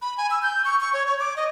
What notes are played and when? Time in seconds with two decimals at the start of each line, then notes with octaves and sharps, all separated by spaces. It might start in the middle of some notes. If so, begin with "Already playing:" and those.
0.02 B5
0.17 G#5
0.31 E6
0.42 G6
0.65 C#6
0.80 C#6
0.93 C#5
1.06 C#5
1.20 D6
1.36 D#5